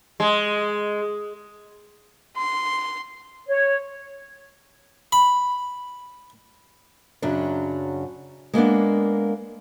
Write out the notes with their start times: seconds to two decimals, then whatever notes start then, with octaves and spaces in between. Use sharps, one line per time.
0.20 G#3
2.37 C6
3.47 C#5
5.12 B5
7.22 F#2 C#3 F#3 D4
8.53 G#3 A#3 B3 D4